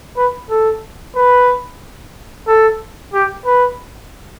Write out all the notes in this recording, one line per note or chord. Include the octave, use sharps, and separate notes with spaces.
B4
A4
B4
A4
G4
B4